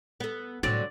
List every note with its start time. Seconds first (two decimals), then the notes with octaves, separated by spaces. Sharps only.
0.20 B3 A4
0.63 A2 D3 F#3 G3 C4 D5